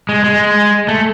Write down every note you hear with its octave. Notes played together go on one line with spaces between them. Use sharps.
G#3
G#3
A3